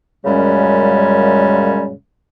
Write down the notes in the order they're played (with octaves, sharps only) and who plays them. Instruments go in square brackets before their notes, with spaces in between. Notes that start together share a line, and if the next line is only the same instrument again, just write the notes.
[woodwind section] F#2 A#2 C#3 G3 G#3 C#4